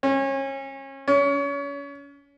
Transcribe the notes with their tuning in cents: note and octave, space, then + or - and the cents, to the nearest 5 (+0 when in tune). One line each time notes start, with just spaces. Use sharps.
C#4 -30
C#4 +30